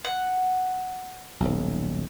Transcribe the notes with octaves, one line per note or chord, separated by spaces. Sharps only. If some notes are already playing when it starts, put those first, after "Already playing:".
F#5
D#1 B1